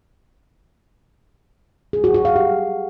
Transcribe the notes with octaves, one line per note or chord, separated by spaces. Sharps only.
G#4
F#4
F#4
F5
G4